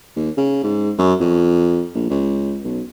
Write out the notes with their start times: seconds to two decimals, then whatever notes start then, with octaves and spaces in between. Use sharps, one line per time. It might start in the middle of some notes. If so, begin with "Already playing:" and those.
0.16 D#2
0.37 C#3
0.64 G#2
0.98 F#2
1.20 F2
1.94 A#1
2.10 C#2
2.64 B1